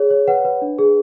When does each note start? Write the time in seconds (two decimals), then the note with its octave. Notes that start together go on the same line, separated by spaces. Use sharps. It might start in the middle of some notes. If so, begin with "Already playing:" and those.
Already playing: G#4 C#5
0.10 C#5
0.27 B4 F#5
0.45 B4
0.62 D4
0.79 G#4